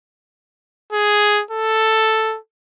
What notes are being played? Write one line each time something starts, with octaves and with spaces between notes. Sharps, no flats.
G#4
A4